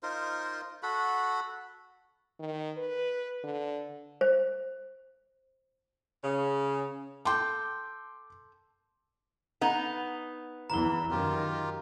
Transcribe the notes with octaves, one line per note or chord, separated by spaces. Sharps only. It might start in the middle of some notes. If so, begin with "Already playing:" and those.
D#4 F4 A#4 C5
F#4 A4 F#5 B5
D#3
B4
D3
C5
C#3
A4 G5 C6 D6
B3 D#4
E2 E3 A#5 B5 G7
F#2 D#3 F4 G4 A#4